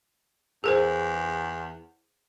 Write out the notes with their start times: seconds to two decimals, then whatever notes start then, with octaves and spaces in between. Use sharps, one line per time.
0.64 E2 G#4 A#4 C5